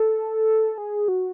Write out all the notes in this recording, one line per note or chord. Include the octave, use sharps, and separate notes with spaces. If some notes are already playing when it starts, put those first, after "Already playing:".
Already playing: A4
G#4
F#4